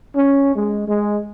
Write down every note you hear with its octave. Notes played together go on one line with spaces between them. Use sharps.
C#4
G#3
G#3